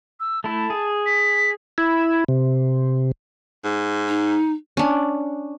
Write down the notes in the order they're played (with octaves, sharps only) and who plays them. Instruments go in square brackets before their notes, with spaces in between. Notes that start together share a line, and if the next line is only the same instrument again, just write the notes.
[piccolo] E6
[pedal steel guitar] A3 E4 [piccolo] A5
[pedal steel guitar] G#4
[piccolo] B6
[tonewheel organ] E4
C3
[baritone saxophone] G#2
[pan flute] D#4
[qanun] C#4 D4